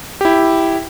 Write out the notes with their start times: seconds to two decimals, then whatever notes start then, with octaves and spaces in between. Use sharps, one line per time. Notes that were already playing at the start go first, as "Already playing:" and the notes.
0.21 E4 G4